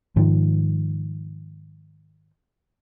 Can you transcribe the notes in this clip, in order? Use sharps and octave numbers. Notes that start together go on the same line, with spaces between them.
G#2 D#3 F3